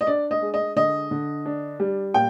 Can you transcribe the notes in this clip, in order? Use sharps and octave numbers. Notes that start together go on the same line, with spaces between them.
D#5
D4 D5
D#5
G#3
D#5
D3 D#5
D3
D4
G3
A#2 G5